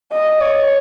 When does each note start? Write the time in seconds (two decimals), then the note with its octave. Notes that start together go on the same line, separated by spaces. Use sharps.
0.12 D#5
0.41 C#5